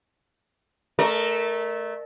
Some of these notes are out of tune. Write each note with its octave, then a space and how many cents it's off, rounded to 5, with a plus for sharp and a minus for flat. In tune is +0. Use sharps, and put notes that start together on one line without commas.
A3 -15 A#4 +0 D5 +40